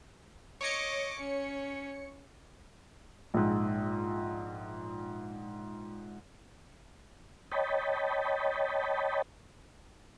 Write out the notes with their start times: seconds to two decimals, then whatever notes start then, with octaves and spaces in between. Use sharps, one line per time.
0.61 C#5 D#5 D6 C#7
1.19 C#4
3.34 A#1 G#2
7.52 C#5 D#5 G5 A5 B5